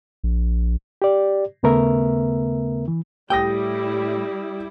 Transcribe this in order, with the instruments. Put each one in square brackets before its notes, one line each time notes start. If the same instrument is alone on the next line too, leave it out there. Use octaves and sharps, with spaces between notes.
[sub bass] A#1
[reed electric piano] G4 D5
D#2 C#3 A3 B3 A#4 E5
E3
[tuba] A2 [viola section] G3 E4 [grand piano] G4 D#6 A#6 [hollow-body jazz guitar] G5